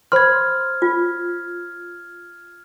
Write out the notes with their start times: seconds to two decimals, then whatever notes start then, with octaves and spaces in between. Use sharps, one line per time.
0.12 C5 B5 C6 F6 G#6
0.82 F4